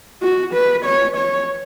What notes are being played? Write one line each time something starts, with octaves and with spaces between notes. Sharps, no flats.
F#4
B4
C#5
C#5